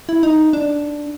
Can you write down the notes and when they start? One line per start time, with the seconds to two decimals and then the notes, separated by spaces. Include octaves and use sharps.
0.09 E4
0.23 D#4
0.53 D4